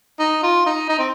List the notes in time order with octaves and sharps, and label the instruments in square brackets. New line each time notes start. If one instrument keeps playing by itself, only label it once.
[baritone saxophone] D#4
F4
D#4
D#4
C4